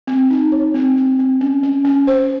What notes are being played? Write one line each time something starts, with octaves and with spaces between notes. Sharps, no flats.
C4
D#4
C#5
C4
C4
C4
C#4
C#4
C#4
C5